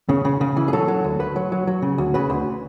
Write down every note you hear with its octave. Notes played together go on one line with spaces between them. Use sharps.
C#3
C#3
C#3
E3
G#4
F#3 A4
F#3
D2
D2 B4
F#3
F#3
F#3
C#3
D2
C#3 B4
D2